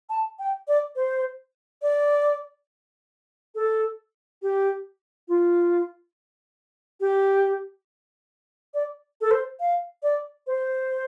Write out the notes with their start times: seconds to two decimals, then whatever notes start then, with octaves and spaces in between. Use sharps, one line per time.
0.10 A5
0.39 G5
0.68 D5
0.96 C5
1.82 D5
3.55 A4
4.42 G4
5.28 F4
7.01 G4
8.74 D5
9.21 A4
9.31 C5
9.60 F5
10.03 D5
10.47 C5